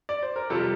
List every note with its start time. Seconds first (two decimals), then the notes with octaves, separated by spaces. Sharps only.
0.09 D5
0.23 C5
0.36 A#4
0.50 F2 C3 G3 F4 A4